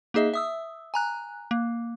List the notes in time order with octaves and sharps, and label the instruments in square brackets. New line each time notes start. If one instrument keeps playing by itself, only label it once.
[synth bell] A#3 D#4 G#4 D#5 E5
E5 D#6 E6
G#5 A#5 F#6
A#3